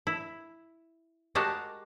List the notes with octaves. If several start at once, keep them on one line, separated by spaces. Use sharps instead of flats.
E4
G#3 F#4 G4 A#4 A5